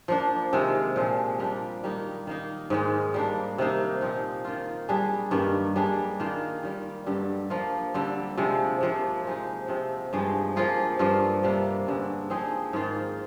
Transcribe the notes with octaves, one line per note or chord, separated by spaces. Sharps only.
F3 A#3 D4
C3 D#3 G#3
A#2 F3 G#3
G3 A#3 D4 G4
D#3 G3 A#3 D#4
D#3 A#3 D#4
G#2 D#3 G#3
G3 A#3 D4
C3 D#3 A#3 D#4
A#2 F3 C4 D#4
D#3 A#3 F4
G3 D4 G#4
G2 D#3 A#3
G3 D4 G#4
D#3 A#3 F4
D#3 G3 A#3
G2 D3 G3
F3 A#3 F4
D3 G3 C4
C3 F3 G#3
C3 F3 A#3
F3 G#3 D#4
C3 F3 C4
G2 F3 G#3 D#4
F3 A#3 F4 G#4
G2 F3 A#3 F4
C3 G3 A#3 D4
G2 D3 G#3
F3 C4 D#4 G#4
G#2 D#3 A#3 F4